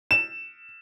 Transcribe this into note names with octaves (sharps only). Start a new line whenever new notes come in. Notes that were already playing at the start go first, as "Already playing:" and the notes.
E7